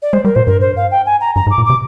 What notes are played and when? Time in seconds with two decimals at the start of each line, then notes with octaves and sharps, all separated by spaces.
0.02 D5
0.13 G#3 C5
0.25 G3 A#4
0.35 A#2 C5
0.47 G2 A#4
0.61 C5
0.76 F5
0.91 G5
1.06 G#5
1.21 A#5
1.36 G2 A#5
1.47 G#2
1.51 D6
1.58 A#2
1.65 C3 D6